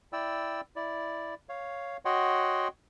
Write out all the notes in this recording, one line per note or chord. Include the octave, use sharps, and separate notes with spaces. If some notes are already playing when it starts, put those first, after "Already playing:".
E4 D5 G5 E6
E4 D5
C#5 F5
F#4 C#5 D#5 F#5 G5 C6